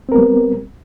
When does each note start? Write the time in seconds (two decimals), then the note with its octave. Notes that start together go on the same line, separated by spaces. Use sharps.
0.09 C4
0.12 A#4
0.15 B3
0.18 G3